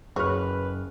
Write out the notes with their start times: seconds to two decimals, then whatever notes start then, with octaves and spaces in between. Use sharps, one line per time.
0.16 F#1 F#4 G#4 B4 C#5 F6